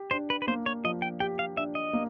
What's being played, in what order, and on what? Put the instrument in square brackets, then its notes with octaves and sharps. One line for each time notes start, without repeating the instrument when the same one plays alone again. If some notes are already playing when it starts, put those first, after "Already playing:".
Already playing: [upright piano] G4
[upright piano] D4 [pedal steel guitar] C5
[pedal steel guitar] B4
B4
[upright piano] A#3 [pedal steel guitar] C5
[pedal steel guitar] C#5
[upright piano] F3 [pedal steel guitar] D#5
[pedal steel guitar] G5
[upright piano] G4 [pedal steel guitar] G5
[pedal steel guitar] F5
[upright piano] D4 [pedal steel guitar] E5
[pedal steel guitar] D#5
[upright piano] A#3